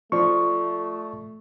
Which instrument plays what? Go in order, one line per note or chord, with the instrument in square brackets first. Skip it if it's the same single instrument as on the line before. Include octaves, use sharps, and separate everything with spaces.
[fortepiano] F3 [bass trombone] A3 [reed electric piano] D5 C#6